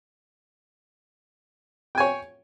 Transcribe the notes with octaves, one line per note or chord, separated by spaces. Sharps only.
C#5 G5 G#5